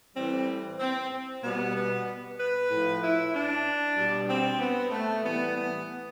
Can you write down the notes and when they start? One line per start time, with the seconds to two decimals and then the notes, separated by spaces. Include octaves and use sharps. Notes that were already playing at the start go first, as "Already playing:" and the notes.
0.15 A2 E3 G3 C4
0.79 C4
1.42 B2 G3 B3
1.75 B3
2.38 B4
2.70 A2 F3
3.01 E4
3.33 D4
3.95 B2 G3
4.28 C4
4.59 B3
4.91 A3
5.23 A2 E3 G3 B3
5.54 B3